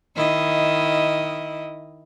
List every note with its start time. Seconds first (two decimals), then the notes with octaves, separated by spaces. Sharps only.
0.16 D#3 E4 D#5